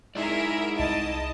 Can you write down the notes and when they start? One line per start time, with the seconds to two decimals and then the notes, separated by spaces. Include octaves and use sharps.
0.15 G#2 E4 G#4 A#4 D5 E5
0.76 C2 D#5 A5 D7